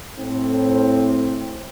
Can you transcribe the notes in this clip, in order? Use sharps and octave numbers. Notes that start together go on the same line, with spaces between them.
A2 C4